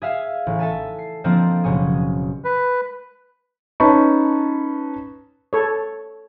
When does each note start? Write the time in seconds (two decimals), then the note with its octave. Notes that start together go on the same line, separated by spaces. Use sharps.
0.02 G#4 E5 F5 G#5 G#6
0.47 A1
0.59 A4 E5 G#5 A5
0.99 C7
1.24 F3 A#3 C4 D4 A4 D#5
1.64 F#1 B2 C#4 G#4
2.45 B4
3.80 C#4 D#4 B4 A5 B5 C#6
5.53 A4 C#5